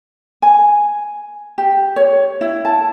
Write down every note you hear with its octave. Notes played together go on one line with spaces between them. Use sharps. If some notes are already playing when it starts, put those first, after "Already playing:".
G#5
G4
C#5
E4
A5